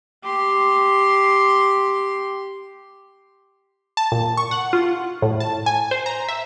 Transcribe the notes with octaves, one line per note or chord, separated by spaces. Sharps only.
G4 C6
A5
A#2
C#6
F#5
F4
A2
A5
G#5
C5
A#5
E5